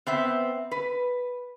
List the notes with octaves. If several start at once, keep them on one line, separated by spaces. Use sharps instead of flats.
B3 C4 E5
B4